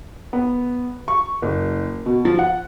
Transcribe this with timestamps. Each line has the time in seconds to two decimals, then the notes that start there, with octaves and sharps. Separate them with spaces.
0.33 B3
1.08 C#6
1.42 F#1
2.06 B2
2.25 F3
2.39 F#5